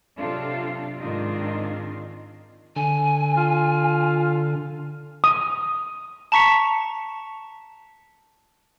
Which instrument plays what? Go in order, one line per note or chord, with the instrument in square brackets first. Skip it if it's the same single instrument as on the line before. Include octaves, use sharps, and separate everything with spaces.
[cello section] C3 F#3 C4 D4 F4 A4
G#2 D#3 C4 D4 D#4 F4
[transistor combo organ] D3 [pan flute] G#5
[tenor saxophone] F4
[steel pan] D#6
[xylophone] A5 A#5 C#6 B6 C#7 F7